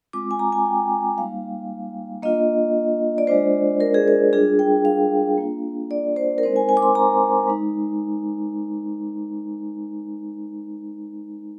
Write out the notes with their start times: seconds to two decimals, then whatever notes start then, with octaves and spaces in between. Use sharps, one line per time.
0.13 G#3 C4 F4 D6
0.31 G#5
0.39 A#5
0.52 G#5
0.66 G5
1.18 G3 A#3 D#4 F5
2.22 A#3 D4 F4 D#5
3.18 D5
3.27 G#3 D4 F4 C5
3.80 A#4
3.94 G#4
4.08 A#4
4.33 G3 D4 F4 G#4
4.59 G5
4.85 F5
5.38 A#3 D4 F4
5.91 D5
6.16 C5
6.38 A#4
6.43 G#3 C4 D#4 C5
6.56 G#5
6.69 G#5
6.77 D6
6.82 C6
6.95 A#5
7.48 G#3 D#4